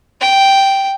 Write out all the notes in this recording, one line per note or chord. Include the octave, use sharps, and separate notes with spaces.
G5